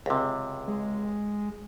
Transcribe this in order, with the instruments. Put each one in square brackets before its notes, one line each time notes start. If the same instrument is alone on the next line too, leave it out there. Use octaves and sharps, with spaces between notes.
[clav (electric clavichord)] C#2 C3
[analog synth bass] G#3